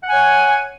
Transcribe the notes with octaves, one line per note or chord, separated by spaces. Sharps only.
C#5 F#5 G#5